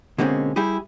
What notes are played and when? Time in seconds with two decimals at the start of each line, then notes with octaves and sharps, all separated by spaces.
0.18 B2 D3 G#3 A#3 C4 C#4
0.56 G3 E4 G4 G#4